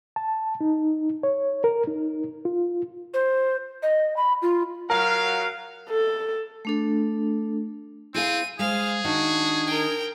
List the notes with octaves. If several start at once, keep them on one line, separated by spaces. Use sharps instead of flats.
A5
D#4
C#5
A#4
D#4
F4
C5
D#5
B5
F4
F#3 A#4 F5
A4
A3 D4 A4
C4 E4 G#4 F5 D#7
G#3 G#4 C5 F5
D#3 D4 D#4 F#4
A#4 G5